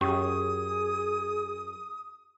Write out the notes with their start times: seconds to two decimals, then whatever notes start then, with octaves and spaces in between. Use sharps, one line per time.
0.01 F#2 C#4 G4 G#4 D#6